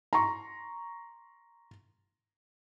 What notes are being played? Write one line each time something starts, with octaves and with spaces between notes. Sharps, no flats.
A#5 C6 C#6